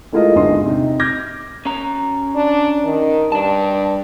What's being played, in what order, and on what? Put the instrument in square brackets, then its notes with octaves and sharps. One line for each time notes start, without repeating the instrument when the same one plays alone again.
[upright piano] G#3 A3 E4 F4 A#4 D#5
G#1 E2 D3 D#5 C6
C3 D#4
D6 F6 G6 G#6 A#6
[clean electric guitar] C#4 A#5
[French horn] D4
D#3
[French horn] G2 [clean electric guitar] D5 A5